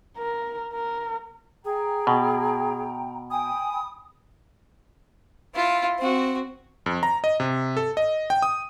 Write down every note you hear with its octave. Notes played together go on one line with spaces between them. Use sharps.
A#4
A#4
G#4 G5 A#5
B2
G5 G#5 B5 D#6
E4 F4
C4 F#4
F2
A#5
D#5
C3
A4
D#5
G5
D#6